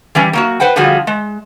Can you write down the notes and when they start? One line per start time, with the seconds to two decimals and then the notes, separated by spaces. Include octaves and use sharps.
0.15 E3 G3 C#4
0.33 F#3 A#3 F#4
0.60 B4 C5 F#5 G5
0.76 D3 F3 G3 F4 F#4 G#4
1.07 G#3